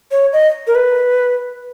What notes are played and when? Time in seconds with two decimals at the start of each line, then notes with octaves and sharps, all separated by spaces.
0.11 C#5
0.33 D#5
0.67 A#4
0.75 B4